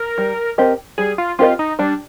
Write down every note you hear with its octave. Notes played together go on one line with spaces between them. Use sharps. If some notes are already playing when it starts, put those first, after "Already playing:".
Already playing: A#4
G3
C4 G4 A#4 D#5
G3 G#4
F4
C4 F4 G4 A#4 D#5
D#4
G3 D4